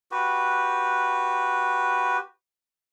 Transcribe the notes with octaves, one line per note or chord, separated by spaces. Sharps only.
F#4 G4 B4